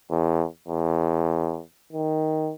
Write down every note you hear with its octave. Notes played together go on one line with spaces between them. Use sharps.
E2
E2
D#3